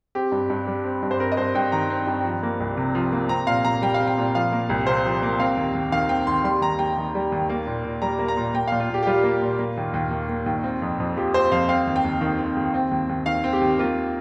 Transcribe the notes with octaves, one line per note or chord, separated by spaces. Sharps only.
C4 G4
G2
G2
G3
C4
G2
C5
C4 A#4
D#5
G2 C5
G2 G5
D#3 A#5
C4
G2
F3
A#3
C2
C3
F3
A#3
C4 A#5
A#2 F5
A#2 A#5
G3 G5
F5
C4
G5
A#2
F3 F5
A#3
C2
C3 C5
F3
A#3
C4 F5
D#2
D#2
D#3 F5
C4 G5
D#2 C6
G3 C6
D#2 A#5
D#2 G5
D#3
G3
D#2
A#3
A#2
A#2
G3 A#5
A#3
A#5
A#2
A#3 G5
A#2 F5
F4
A#2 G4
G4
G3 F4
A#3
A#2
A#3
D#2
D#2
D#3
A#3
D#2
C4
F2
F2
F3 G4
C4 C5
F2 F5
C4 F5
D#2
G5
D#2
D#3
C4
D#2
C4
D#2
D#2
D#3 F5
C4
G4
D#2
A#3 F4